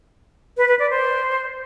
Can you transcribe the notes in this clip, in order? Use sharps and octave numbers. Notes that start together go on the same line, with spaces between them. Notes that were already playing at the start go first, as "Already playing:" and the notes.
B4
B4
D5
C5